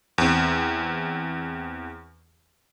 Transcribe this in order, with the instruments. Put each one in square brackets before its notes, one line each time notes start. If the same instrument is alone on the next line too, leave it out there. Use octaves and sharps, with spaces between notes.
[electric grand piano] E2 C4